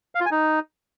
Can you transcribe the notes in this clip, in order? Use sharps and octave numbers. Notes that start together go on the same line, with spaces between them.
F5
F4
G#5
D#4